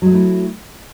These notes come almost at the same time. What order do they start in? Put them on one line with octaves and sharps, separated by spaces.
F#3 G#3 A3 E4